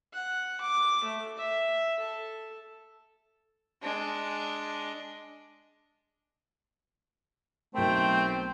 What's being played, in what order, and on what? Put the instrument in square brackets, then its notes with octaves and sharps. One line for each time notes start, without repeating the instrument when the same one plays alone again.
[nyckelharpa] F#5
D6
A3
E5
A4
[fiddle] G#3 D4
[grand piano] B1 A#4 [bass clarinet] A3 [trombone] C4 [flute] G5